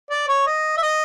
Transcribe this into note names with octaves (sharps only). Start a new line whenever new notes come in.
D5
C#5
D#5
E5
D#5